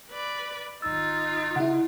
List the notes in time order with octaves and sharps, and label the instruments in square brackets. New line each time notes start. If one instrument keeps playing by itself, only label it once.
[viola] B4 D5
[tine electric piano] G#1 E6 [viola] D#4 F4 [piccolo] A6
[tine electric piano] C#3 [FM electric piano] E4 F#5